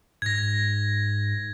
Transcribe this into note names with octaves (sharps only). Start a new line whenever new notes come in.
G#2 G#6 A#6